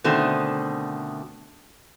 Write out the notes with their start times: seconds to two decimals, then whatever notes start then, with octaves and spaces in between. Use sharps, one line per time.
0.04 B2 D3 D#3 A3 C4